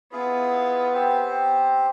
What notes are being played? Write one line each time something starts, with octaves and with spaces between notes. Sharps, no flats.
B3 E4 F4 G#4
C4 G4 C5